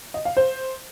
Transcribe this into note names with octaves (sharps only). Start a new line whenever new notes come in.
D#5
F5
C5